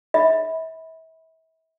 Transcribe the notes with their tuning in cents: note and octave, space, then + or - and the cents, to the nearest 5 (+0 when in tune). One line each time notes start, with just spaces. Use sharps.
E5 -35 B5 +0